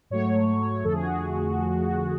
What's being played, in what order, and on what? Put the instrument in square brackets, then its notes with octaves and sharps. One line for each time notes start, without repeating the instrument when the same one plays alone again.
[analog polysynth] G#2 F#3 A3 C#5
F2 D3 F3 A3 A4
G#4
F#4
G#4